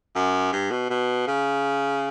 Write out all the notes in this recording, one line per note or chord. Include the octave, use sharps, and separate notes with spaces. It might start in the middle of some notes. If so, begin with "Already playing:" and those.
F#2
G2
B2
B2
C#3